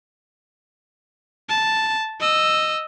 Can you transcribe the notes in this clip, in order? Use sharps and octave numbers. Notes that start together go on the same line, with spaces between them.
A5
D#5 E6